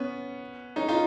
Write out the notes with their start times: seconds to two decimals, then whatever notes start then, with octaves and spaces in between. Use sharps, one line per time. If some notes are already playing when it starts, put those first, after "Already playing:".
Already playing: B3 C#4
0.76 C#4 D#4
0.89 D#4 F4